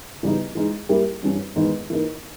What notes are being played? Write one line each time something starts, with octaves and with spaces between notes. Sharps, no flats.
C#3 E3 G3 B3 D#4
E3 G#3 D#4 G#4
G3 A#3 E4 G4 A#4
G2 E3 G3 C#4
E2 D#3 G#3 B3 D#4
E3 A#3 D#4 A#4